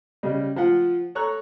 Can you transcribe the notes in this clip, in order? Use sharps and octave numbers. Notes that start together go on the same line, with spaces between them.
C#3 G3 D#5
F3 F4 F#5
A4 C#5 A#5 C#6 F#6